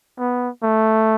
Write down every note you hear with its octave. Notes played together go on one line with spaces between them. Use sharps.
B3
A3